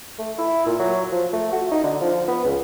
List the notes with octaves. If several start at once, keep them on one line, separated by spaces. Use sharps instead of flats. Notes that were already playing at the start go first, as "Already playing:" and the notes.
A3
E4
A#2
F#3
F3
A3
F#4
D#4
D3
F3
B3
C#2